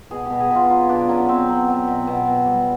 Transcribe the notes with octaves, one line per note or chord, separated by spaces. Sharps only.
B2 G#4
B2 G4
G#4
B2
F4
F#3 F4
B2 D4
F#3 C#4
B2 C4
F#3
F#3
B2
B2
B2
G3